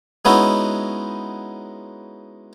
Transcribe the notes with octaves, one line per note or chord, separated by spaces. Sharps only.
G#3 B3 C#4 D#4 E4 F#4